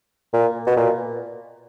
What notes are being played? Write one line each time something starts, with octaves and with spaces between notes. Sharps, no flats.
A#2
B2
A#2